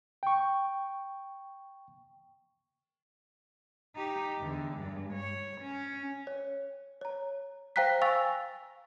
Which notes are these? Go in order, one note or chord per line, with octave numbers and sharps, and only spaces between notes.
G5 C#6
D#4 G4
E2 D3
G2 G#3
C#5
C#4
C#5
C#5 A#5
C5 F5 G5 A#5 F#6 B6
F5 G#5 C#6 E6 A6 F7